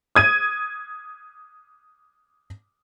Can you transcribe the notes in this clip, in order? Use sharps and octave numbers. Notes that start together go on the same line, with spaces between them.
D#6 G#6 D#7